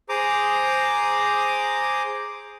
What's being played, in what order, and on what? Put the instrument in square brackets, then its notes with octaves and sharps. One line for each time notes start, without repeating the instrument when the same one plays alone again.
[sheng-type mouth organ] G#4 C5 A#5 D6 D#6